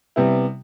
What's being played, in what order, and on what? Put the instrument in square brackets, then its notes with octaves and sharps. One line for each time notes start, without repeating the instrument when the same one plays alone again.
[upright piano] C3 G3 B3 E4